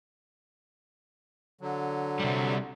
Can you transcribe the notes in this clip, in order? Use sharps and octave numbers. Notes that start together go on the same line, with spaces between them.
D3 F#3
C3 G3